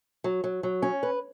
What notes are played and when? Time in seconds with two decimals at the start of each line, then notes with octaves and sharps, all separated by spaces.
0.24 F#3
0.44 F#3
0.63 F#3
0.82 C#4
1.03 B4